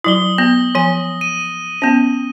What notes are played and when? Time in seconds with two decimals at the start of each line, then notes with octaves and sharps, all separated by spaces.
0.04 F#3 E4 D#6 G7
0.38 B3 A#6
0.75 F3 G#5
1.21 D#7
1.82 B3 C#4